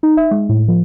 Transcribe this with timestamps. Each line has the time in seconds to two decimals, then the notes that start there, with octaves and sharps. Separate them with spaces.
0.03 D#4
0.17 E5
0.31 G#3
0.49 A2
0.68 F3